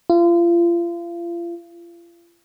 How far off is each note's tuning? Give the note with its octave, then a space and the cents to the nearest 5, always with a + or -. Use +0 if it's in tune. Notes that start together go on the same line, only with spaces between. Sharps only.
F4 -35